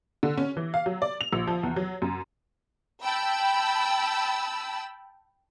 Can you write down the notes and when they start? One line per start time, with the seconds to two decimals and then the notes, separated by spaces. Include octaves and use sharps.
0.23 D3
0.38 C#4
0.57 E3
0.74 F5
0.86 F#3
1.02 D5
1.21 F7
1.33 A#1
1.47 F3
1.63 E2
1.76 F#3
2.02 F#2
3.03 G5 A5 B5 E6